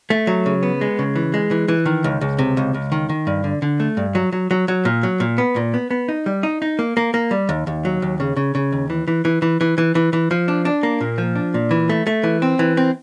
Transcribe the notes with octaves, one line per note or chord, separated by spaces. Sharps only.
A3
F#3
C#3
B3
G#3
C#3
E3
G#3
E3
E3
D#3
C#2
C#2
C3
C#2
C#2
D#3
D#3
G2
D3
D3
A3
G2
F#3
F#3
F#3
F#3
A#2
F#3
A#2
B3
A#2
B3
B3
D#4
G3
D#4
D#4
A#3
A#3
A#3
G3
D#2
D#2
F#3
D#2
C#3
C#3
C#3
D#2
E3
E3
E3
E3
E3
E3
E3
E3
F3
D4
D4
A#3
A#2
F3
D4
A#2
E3
A3
A3
E3
C4
E3
C4